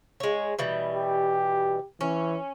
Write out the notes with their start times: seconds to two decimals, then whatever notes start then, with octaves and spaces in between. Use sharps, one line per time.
0.20 G#3 C#5
0.59 B2 E3 G3
0.95 G4
2.01 E3 C#4